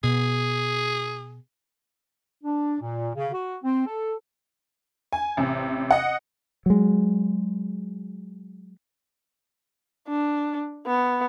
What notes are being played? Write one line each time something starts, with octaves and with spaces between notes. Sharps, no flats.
B2 G#4
D4
A#2
C#3
F#4
C4
A4
G#5
A1 C3
D#5 F#5
F#3 G#3
D4
B3